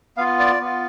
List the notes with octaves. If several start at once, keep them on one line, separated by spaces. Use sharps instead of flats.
B3 F4 F5
D5
B3 F4